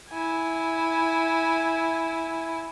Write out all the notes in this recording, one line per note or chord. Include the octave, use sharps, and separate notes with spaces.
E4 G#5